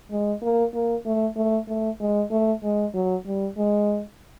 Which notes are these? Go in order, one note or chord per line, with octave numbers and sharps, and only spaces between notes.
G#3
A#3
A#3
A3
A3
A3
G#3
A3
G#3
F#3
G3
G#3